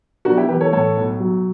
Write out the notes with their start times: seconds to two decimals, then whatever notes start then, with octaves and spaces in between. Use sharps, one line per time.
0.25 B1 D4 F#4
0.37 E4 G4
0.48 E3 G4 B4
0.61 A4 C#5
0.73 A2 A4 C#5
0.97 B1
1.20 F#3